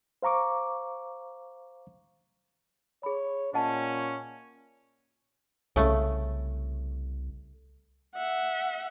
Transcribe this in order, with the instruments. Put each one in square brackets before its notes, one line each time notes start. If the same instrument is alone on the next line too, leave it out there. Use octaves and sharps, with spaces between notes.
[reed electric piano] C5 F5 A#5 C#6 D6
[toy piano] G#4 B5 [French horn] C#5
[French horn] A#2 [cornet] C#4 [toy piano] D#5 F#5 A5
[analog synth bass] C2 [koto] C#3 A3
[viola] E5 F#5